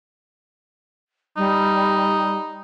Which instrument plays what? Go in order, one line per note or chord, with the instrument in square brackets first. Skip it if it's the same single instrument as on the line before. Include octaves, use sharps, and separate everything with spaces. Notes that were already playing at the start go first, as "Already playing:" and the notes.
[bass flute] G3 [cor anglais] D#4